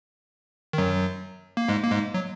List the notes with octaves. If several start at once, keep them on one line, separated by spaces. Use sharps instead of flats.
D#3
F#2 F#3
A#3
G#2 G#3
A#3
G#2 G#3
F#3